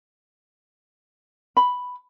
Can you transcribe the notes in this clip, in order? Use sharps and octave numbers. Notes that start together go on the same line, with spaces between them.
B5